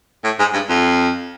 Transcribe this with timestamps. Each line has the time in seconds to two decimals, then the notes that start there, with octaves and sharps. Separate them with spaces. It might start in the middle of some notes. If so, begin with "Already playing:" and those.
0.24 A2
0.39 G#2
0.54 G2
0.69 F2